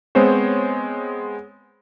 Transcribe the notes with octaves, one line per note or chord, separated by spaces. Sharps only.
G#3 B3 C4 C5 C#5